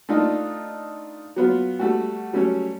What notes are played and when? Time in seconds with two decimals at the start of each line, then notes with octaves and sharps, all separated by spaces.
0.09 A3 D4 D#4 F4
1.36 F#3 B3 F4
1.79 G3 A3 F#4
2.33 F#3 G3 A3 C#4